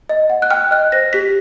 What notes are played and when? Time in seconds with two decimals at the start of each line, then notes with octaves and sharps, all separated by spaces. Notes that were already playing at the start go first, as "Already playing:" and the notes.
0.09 D#5
0.30 F#5
0.42 F#6
0.50 G5 F6
0.71 D#5 F#6
0.92 C5 A#6
1.13 G4 B6